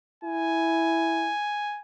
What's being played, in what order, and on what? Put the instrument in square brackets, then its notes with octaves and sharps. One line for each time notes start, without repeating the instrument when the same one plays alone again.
[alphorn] E4 [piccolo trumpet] G#5